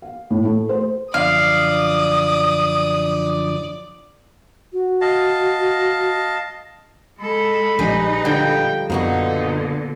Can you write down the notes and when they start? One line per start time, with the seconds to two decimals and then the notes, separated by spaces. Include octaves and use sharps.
0.02 F5
0.30 A2
0.44 A3
0.69 C5
1.14 F#2 D3 F3 D5 F5 D#6
4.73 F#4
5.01 D#5 F5 A5
7.19 G#3 A4 B5
7.79 A#1 G3 G#3 D#4 G4 B4
8.25 D3 F3 G3 G5
8.90 F#1 A#2 D3 A#3 B3 D#4 F#4